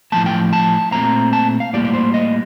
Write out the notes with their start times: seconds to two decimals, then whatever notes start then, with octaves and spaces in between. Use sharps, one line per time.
0.12 A2 F3 A#3 A5
0.26 G5
0.53 A5
0.92 A#2 A3 C4 A#5
1.33 A5
1.60 F5
1.73 A2 G3 A#3 D5
1.85 D5
1.94 C5
2.14 D#5